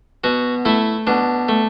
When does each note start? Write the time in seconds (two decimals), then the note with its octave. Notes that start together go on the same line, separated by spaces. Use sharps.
0.24 B2 F#4
0.65 A3 E4
1.07 B2 D4
1.49 A3